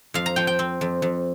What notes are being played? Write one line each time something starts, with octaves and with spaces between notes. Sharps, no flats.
F2 F5
A#5
F3 G5
G5
C4
F2
F2